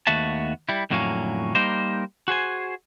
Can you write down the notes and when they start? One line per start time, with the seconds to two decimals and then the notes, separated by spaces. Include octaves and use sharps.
0.07 D#2 A3 B3 F#4 E5 A5
0.69 G3 E4
0.90 F2 A2 D3 F#3 A#3 C#4
1.55 G3 A#3 D#4 A#4 C5
2.28 F#4 G#4 C5 G#5